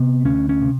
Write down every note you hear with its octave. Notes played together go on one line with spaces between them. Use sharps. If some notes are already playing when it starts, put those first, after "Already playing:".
Already playing: C3 B3
D2 C#4
C#4
C3